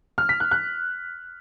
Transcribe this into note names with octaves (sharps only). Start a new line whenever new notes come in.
F6
B6
F#6
F#6